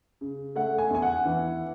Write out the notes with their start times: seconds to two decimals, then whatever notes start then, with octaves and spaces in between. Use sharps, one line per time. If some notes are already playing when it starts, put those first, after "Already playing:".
0.21 C#3
0.56 A3 F#5
0.78 G#5
0.90 E2 G#5
1.02 F#5
1.25 E3